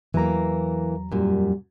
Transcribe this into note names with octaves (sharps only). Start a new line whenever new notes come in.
E2 E3 F#3 A#3 A#5
F#2 A#2 G3